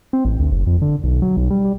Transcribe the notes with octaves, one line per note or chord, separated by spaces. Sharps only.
C4
A1
D2
F#1
F2
D3
B1
F#3
B1
G3
G3